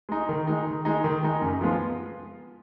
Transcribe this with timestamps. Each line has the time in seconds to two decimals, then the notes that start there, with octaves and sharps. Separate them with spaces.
0.09 G#3 D#4
0.29 D#3
0.47 G#3 D#4
0.67 D#3
0.85 G#3 D#4
1.04 D#3
1.23 G#3 D#4
1.42 F#2
1.61 F3 G#3 B3 F4